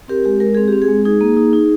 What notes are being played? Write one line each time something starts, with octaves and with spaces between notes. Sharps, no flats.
C4 G4 A#4
G#3 G4
G#3 A#4
C4 G#4
C4 G4
G#4
G#3
D#4 G#4
A#3
D#4
D#4